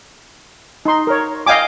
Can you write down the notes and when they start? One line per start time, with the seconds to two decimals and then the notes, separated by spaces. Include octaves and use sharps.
0.85 D#4 C6
1.07 A#4 C#5
1.47 D#5 F5 G5 G#5 D6